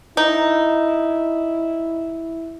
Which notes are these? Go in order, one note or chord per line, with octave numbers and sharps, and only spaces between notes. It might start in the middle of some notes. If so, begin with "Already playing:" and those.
D#4 E4